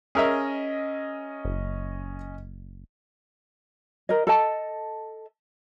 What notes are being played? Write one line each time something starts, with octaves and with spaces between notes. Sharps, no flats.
C#4 G#4 A#4 D#5 E5
F#1
A#4 D#5
A4 D#5 A5